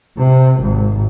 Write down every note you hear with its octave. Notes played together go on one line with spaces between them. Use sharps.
C3
G#1